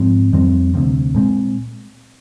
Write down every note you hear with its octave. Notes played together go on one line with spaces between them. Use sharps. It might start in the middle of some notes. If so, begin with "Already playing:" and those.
Already playing: G#2 F3 C4
F2 D#3 G3 C4
D2 C3 G3 C4
A#2 G#3 C4